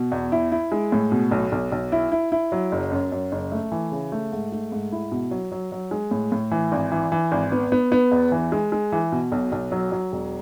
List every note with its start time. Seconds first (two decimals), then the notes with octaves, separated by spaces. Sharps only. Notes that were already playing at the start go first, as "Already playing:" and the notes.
Already playing: B2
0.12 E2
0.32 E4
0.52 E4
0.72 G#3
0.92 A2
1.12 B2
1.31 B1
1.52 B1
1.72 B1
1.92 E4
2.12 E4
2.32 E4
2.52 F#3
2.72 F#1
2.92 F#2
3.12 F#2
3.32 F#1
3.52 A3
3.72 E3
3.92 C#3
4.12 A3
4.32 G#2
4.52 A3
4.72 G#2
4.92 E4
5.12 B2
5.31 F#3
5.52 F#3
5.72 F#3
5.91 G#3
6.11 A2
6.32 A2
6.51 E3
6.72 G#1
6.92 E3
7.12 E3
7.32 G#1
7.52 B3
7.72 B3
7.92 B3
8.11 E2
8.32 E3
8.52 G#3
8.72 G#3
8.92 E3
9.12 B2
9.32 B1
9.52 B1
9.72 F#3
9.92 F#3
10.12 E1